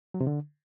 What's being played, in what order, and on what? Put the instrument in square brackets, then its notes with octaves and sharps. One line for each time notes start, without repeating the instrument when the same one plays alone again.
[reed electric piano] F#3
C3
D3